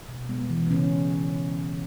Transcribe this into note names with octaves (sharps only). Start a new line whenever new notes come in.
B2
G#3 B3
E3
B3
C#3 C#4